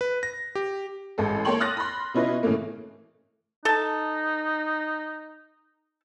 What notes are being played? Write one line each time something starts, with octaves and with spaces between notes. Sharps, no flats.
B4
A#6
G4
A1 G#3 A4
A#3 A4 C#5 G5 C6 F#7
D6 D#6 F6 F#6 A6 A#6
B5 C6
B2 C#4 E4 F4 B4 D#5
A2 C#3 E3 A3 A#3
D#4 A4 A5